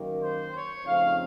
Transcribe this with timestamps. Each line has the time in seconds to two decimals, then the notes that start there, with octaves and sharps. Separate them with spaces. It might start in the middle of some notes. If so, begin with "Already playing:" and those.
Already playing: F#2 D#3 A#3
0.23 C5
0.54 C#5
0.86 F2 C#3 A3 C4 D#4 F5